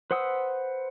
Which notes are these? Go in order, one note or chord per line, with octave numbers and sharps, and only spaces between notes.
B4 C5 F#5 D#6 E6